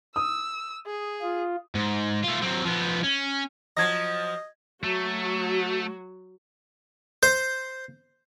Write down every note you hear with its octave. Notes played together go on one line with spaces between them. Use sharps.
D#6 E6
G#4
F4
G#2
A3 F4
F#3 C4
F3 B3
C#4
F3 F#3 D#5 G#6 A#6
F#3 A3 F#4
C5